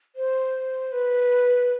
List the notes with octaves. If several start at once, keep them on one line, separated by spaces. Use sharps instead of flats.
C5
B4